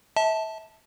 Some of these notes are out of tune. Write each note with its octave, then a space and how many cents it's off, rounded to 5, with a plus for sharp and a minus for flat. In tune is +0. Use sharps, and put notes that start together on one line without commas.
E5 -30 A5 +0